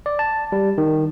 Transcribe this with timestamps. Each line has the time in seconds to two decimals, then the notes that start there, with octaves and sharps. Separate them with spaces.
0.06 D5
0.19 A5
0.52 G3
0.78 D#3